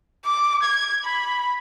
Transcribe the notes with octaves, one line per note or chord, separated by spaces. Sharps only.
D6
G#6
B5